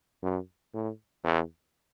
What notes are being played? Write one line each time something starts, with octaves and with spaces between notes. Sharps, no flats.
F#2
A2
E2